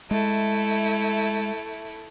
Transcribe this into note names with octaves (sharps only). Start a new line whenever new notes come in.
G#3 A3 E4